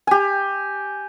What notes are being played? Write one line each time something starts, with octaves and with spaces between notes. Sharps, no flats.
G4 G#5